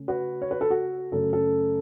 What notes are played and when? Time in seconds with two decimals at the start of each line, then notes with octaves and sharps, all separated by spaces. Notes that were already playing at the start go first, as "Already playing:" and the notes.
Already playing: C#3 A3 C#4
0.08 F#4 B4
0.42 C#5
0.51 B4
0.61 A4
0.70 F#4
1.12 F#2 C#3 A3 C#4 A4
1.33 A4